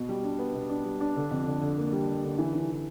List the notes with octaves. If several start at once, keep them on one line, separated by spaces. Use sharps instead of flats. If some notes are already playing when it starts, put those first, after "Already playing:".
Already playing: B2
G3
D4
B3
B2
D4
G3
D4
D3
F2
D3
D3
A#3
G3
G3
D3
E3
E3
E3